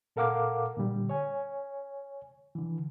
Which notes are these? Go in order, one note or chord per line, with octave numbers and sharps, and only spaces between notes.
A#2 A4 A#4 F5 F#5 D6
A#2 D3 G3
C#5 G#5
D3 E3